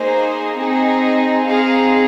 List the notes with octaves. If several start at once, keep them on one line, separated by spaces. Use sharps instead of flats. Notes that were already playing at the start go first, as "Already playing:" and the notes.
Already playing: A#3 D#4 G#4 C5
C4 D#4 G#4
C4 D#4 G#4 F5